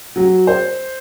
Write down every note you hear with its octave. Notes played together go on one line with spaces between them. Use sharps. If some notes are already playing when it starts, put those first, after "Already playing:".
F#3
C5